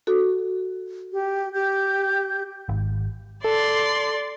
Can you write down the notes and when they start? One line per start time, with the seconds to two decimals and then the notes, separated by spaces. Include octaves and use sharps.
0.07 F#4 A4
1.13 G4
1.54 G4 G6
2.69 G#1
3.44 A4 D5 C6